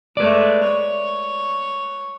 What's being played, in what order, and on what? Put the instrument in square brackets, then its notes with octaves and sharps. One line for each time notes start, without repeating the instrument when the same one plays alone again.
[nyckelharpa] G#3 A3 [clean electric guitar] B4 D5
[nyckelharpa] C#5